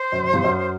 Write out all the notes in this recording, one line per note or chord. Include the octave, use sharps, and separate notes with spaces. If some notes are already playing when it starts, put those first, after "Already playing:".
Already playing: C5
F#2
F#2
E2 G2
F#2